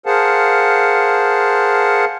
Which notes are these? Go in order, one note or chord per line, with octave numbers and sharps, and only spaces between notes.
G#4 A#4 C5 F5 F#5 A5